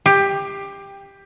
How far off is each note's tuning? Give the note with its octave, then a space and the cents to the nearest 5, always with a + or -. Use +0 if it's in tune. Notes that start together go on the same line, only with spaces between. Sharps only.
G4 +15